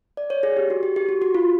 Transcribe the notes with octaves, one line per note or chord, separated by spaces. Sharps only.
D5
C#5
G#4
G4
F#4
G4
G4
F#4
F#4
F4